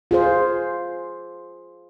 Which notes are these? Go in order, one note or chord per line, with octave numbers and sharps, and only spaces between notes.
F4 G#4 C5